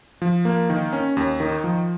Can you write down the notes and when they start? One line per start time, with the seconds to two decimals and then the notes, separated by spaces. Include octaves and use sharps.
0.22 F3
0.45 A#3
0.70 D#3
0.93 C#4
1.17 D#2
1.40 D#3
1.64 F3